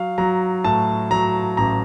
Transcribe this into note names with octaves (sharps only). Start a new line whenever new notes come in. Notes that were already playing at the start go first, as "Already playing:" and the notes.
Already playing: F#3 F5
F#3 A#5
A2 A5
F#3 A#5
A1 A#5